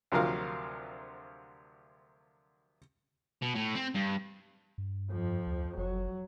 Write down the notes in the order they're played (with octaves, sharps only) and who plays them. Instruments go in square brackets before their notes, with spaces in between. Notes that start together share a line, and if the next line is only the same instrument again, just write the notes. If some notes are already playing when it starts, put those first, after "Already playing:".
[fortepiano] D2 C3 F3 F#3 A#4 F5
[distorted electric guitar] B2
A2
C4
G2
[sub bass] G2
[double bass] F2 F3
[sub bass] D2
[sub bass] F#1 [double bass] F#3